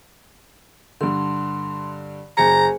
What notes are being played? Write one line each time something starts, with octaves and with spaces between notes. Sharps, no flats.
G2 D3 C6
F#1 G#4 C5 G#5 A#5 C#7